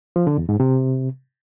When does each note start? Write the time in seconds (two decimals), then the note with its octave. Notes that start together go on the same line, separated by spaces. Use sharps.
0.16 F3
0.27 D3
0.38 E2
0.49 G#2
0.60 C3